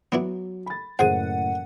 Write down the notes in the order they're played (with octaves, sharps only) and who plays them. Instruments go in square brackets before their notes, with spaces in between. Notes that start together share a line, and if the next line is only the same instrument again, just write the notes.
[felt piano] F#3 [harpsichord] B3 D4 E4
[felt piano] B5 A6
[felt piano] F#1 A2 D#7 [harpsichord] G#4 C5 [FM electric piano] F#5